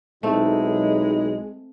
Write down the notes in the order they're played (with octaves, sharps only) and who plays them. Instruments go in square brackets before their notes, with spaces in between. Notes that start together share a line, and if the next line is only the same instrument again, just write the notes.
[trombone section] B1 D#4 [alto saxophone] G#3 [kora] A3 C4 [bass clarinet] E4